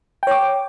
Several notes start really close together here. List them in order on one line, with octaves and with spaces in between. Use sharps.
G5 C#5 D6